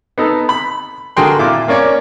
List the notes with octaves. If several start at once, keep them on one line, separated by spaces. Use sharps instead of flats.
B3 D#4 A4
B5
D3 F#4 G#4 A#4 G5 C6
A#2 E4 F4 D6
A#3 C#4 D5 C#6